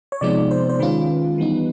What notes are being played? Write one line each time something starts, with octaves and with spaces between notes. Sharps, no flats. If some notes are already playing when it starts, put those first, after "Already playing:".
C#5
C3 F3 G#3 B3 D#4 D5
C5
C5
D#3 G#3 C#4 F4 B4
E3 G3 B3 D#4